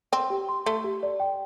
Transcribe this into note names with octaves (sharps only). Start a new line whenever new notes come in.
C4 G5
G4
C6
A3 C6
G4
D5
G5